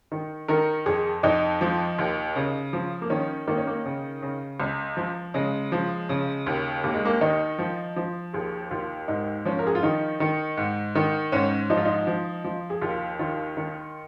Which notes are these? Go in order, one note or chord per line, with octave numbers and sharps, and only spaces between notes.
D#3
D#3 A#4
F2 G#4
F2 D#4
F3
D#2
C#3
F3
A#3
D#3 C#4
D#3 A#3
C#4
A#3
C#3
C#3
C#2
F3
C#3 G#3
F3
C#3
D#2
D#2 A#3
G#3
A#3
D#3 D#4
F3
F3
D#2 G#4
D#2 F4
G#2 D#4
F3 C#4
A#4
G#4
F4
D#3 D#4
D#3
G#2
D#3
G#2 C#4
F3 D#4
F4
D#4
F3
F3
G#4
D#2 F4
D#3 F4
D#3